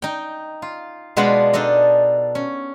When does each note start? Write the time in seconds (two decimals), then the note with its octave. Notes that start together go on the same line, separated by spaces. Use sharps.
0.02 D#4 G5
0.62 F4
1.17 B2 G#3 B3 D4 F4 B5
1.53 D4 D#4 A4 D#5
2.35 C#4